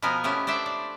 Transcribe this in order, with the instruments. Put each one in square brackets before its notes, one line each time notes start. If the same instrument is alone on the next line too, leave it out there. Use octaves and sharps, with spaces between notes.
[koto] B2 F3 B3 A#4 G#5
A3 B3 C#4 E4 G4
D4 C5 D5 E5
D5